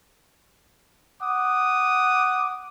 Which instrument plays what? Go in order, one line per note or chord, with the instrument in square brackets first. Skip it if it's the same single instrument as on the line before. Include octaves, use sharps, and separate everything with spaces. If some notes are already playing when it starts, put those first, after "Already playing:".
[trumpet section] F#5 D6 D#6